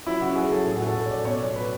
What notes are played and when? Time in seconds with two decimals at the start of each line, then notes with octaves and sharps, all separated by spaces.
0.06 F#3 E4
0.21 C#3 F#4
0.36 F#3 G#4
0.51 F#3 A4
0.66 A2
0.76 F#4
0.81 A2
0.87 A4
0.96 A2
1.06 C#5
1.11 A2 D5
1.25 B2 C#5
1.34 D5
1.40 F#3 C#5
1.55 F#3 B4